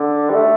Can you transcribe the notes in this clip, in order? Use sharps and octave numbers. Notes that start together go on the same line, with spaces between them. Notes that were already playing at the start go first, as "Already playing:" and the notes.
Already playing: D3
G3
A3